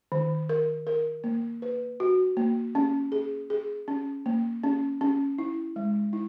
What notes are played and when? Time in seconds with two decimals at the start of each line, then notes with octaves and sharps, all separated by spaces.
0.12 D#3
0.49 A#4
0.87 A#4
1.24 A#3
1.62 B4
2.00 F#4
2.37 A#3
2.75 C#4
3.12 G#4
3.50 G#4
3.88 C#4
4.26 A#3
4.63 C#4
5.01 C#4
5.39 E4
5.76 G#3
6.13 E4